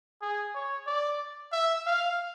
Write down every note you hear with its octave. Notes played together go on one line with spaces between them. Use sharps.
G#4
C#5
D5
E5
F5